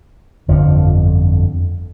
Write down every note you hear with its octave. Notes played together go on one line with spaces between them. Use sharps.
G1 F2 D3 F3